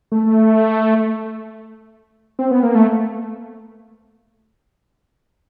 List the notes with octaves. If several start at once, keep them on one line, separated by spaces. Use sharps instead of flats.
A3
C4
B3
A#3
A3